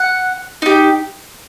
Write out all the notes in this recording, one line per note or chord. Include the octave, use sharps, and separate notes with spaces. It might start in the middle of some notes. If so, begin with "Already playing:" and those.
Already playing: F#5
D#4 G4